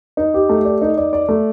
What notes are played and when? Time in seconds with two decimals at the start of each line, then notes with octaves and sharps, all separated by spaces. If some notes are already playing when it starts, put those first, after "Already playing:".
0.17 D#4
0.34 G4
0.49 A3
0.65 D5
0.82 D#4
0.97 D5
1.13 D5
1.29 A3